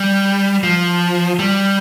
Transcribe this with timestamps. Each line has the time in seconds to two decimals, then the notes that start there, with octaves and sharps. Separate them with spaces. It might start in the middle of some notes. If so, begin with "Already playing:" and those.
Already playing: G3
0.64 F3
1.39 G3